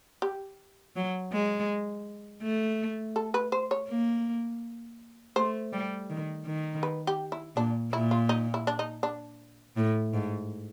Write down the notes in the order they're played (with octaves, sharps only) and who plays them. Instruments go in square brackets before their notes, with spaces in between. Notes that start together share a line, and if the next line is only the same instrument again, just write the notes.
[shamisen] G4
[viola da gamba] F#3
G#3
A3
[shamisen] A4
B4
C5
C#5
[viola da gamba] A#3
[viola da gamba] A3 [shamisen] C5
[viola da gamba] G3
D#3
D#3
[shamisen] B4
G4
E4
[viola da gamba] A#2 [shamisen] D4
[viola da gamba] A#2 [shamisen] E4
[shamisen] F4
D#4
E4
D4
D#4
D4
[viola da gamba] A2
G#2